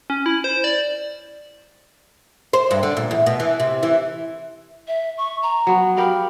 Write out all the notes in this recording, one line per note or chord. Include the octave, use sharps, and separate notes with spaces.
C#4
E4
C5
D5
C5
G2
D3
A#2
E2
B2
E3
C3
E3
E5
C#6
A#5
F#3 B3
G4 A#4 F5 B5